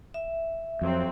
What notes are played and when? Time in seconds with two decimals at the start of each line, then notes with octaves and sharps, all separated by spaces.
0.14 E5
0.82 F2 F#3 C4